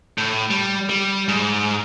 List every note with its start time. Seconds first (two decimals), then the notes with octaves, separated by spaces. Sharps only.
0.18 A2
0.51 G3
0.90 G3
1.28 G#2